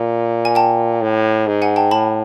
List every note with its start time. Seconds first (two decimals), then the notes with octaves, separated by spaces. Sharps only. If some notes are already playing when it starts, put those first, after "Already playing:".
Already playing: A#2
0.45 G#5
0.55 G5 A5
1.02 A2
1.47 G#2
1.62 F#5 G#5
1.76 G5 A5
1.91 A2 A5 B5